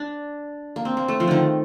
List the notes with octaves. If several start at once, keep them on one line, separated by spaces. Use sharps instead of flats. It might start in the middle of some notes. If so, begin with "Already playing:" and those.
Already playing: D4
A#3
C4
A#3
A3
F3
D3 D#3